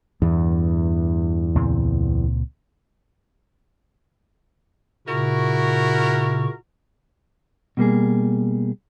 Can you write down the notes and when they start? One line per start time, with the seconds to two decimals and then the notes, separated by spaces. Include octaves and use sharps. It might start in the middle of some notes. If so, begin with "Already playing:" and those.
0.22 E2 G2
1.55 C#2 A#2 C4
5.07 A#2 C#3 E4 F#4 A#4 C#6
7.77 B2 G3 A#3 G#4